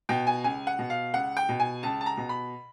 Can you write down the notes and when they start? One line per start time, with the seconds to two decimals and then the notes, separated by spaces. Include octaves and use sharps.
0.09 B2 G5
0.27 G#5
0.44 C#2 G#5
0.67 F#5
0.79 B2
0.90 F5
1.14 C#2 F#5
1.37 G5
1.49 B2
1.60 G#5
1.83 C#2 A5
2.01 A5
2.06 A#5
2.17 B2
2.29 B5